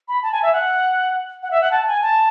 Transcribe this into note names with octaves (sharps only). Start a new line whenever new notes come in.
B5
A5
G#5
E5
F#5
F#5
E5
F#5
A5
G#5
A5